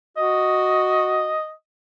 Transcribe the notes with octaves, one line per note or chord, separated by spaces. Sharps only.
F#4 D#5